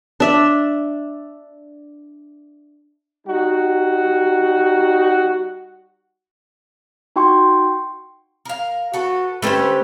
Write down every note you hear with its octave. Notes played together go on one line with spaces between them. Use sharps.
D4 E5
G3 D#4 F#4
D#4 F#4 G5 C6 C#6
A#4 F5
F#4 A4 B4
D3 A3 C#4 G4 B4 C5